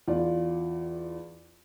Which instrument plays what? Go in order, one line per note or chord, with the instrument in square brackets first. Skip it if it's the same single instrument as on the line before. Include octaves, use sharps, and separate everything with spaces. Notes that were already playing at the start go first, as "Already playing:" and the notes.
[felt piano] E2 F4 D5